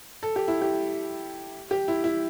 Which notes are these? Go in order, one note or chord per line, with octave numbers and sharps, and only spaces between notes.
A4
G4
E4
G4
G4
E4
E4